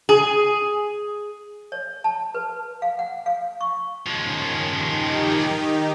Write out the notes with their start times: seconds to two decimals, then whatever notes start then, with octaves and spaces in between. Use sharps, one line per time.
0.09 G#4
1.72 C#5
2.04 A5
2.35 B4
2.82 F5
2.99 F#5
3.26 F5
3.61 C#6
4.07 D#3 F3 G#3 C#4
4.68 D#3 D#4 G4